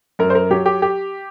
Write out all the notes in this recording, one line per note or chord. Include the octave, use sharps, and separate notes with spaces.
F#2 A#4
C5
A#4
F#3 G4
G4
G4